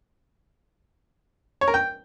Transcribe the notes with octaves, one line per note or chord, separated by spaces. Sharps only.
C#5
A#4
G5